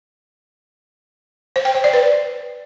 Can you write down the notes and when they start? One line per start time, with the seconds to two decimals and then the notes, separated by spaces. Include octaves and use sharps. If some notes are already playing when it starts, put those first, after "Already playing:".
1.56 C5
1.65 G5
1.75 C5
1.84 D5
1.93 B4